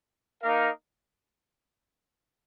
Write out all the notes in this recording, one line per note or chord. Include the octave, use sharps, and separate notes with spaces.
A#3 D#4 A#4 F5